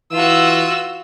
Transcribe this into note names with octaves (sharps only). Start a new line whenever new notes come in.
E3 F4 F#4 E6